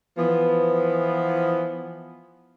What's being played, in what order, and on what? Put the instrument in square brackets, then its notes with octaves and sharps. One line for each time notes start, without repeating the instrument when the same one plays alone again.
[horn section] E3 F3 B3